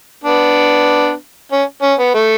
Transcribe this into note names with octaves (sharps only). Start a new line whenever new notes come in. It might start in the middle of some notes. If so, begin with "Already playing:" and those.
B3 D4
C#4
C#4
B3
A3